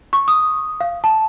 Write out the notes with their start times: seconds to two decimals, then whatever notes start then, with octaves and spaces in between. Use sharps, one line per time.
0.13 C#6
0.28 D#6
0.81 F5
1.04 A5